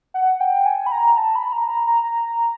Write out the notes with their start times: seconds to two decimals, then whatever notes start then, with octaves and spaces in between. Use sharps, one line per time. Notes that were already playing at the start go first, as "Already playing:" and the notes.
0.14 F#5
0.41 G5
0.66 G#5
0.86 B5
0.92 A#5
1.18 A5
1.36 B5
1.53 A#5
1.69 A#5
1.87 A#5
2.04 A#5